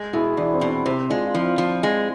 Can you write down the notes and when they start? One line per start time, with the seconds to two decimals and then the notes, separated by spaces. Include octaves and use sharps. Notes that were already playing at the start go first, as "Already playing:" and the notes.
Already playing: G#3
0.13 B2 E4 G#4
0.37 E2 D4
0.53 C4
0.61 B2
0.69 D4
0.85 C3 C4 E4
1.10 G#3 D4 F4
1.26 F4
1.34 F3 C4 E4
1.58 F3
1.83 G#3